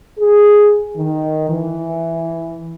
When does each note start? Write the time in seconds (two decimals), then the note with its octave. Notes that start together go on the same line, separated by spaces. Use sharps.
0.18 G#4
0.97 D#3
1.49 E3